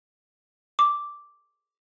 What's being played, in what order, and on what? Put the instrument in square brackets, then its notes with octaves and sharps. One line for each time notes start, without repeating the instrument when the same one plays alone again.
[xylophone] D6